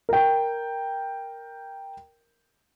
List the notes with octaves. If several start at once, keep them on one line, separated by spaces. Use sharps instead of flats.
A#4 G5